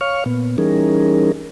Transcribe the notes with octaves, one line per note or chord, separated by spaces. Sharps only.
C#5 F5 C#6 F6
A#2 B3
E3 G3 C#4 D#4 G#4 A#4